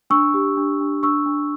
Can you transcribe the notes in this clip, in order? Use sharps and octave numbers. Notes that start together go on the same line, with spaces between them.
D4 C#6 E6
G4
D4
D4
D4 C#6 E6
D4